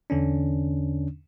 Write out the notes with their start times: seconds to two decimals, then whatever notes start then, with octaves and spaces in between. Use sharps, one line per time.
0.10 E2 D3 C#4 D4